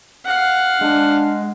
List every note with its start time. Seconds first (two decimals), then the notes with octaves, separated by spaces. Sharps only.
0.25 F5 F#5
0.81 G#3 D4